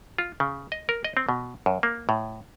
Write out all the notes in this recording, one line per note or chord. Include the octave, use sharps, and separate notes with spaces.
F4
C#3
D#5
A#4
D#5
C4
B2
F#2
A#3
A2